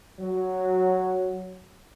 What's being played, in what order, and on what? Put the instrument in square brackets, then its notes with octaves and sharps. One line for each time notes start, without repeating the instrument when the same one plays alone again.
[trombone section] F#3